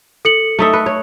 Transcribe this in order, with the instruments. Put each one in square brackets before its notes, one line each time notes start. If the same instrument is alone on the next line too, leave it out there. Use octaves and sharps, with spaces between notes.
[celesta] A4 C#7 F#7
[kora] A3 D#4 E5
B4
C#5